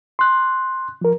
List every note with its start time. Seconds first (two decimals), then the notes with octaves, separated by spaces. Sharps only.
0.19 C6 F#6
1.01 F3 A#4